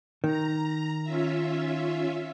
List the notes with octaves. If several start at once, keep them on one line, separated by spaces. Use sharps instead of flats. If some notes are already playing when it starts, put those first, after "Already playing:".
D#3 A#5
C#4 F4 E5